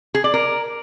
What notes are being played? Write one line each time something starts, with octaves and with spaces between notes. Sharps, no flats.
G#4
D5
A#4